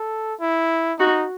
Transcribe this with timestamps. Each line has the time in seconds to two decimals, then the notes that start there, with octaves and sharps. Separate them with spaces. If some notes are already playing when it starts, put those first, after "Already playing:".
Already playing: A4
0.41 E4
0.99 D#4 F#4